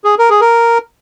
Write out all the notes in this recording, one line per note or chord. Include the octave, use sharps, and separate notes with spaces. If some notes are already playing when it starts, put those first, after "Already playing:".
G#4
A#4
G#4
A#4